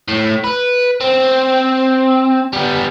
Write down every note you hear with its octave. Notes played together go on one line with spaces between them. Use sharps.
A2
B4
C4
G3 B3